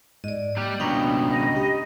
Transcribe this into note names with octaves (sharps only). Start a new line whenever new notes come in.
G#2 D5 D#5
G3 A#3 G4 F#6
C#2 B2 C#4 D4 G5 A#5 B5 D#6
D#5
G4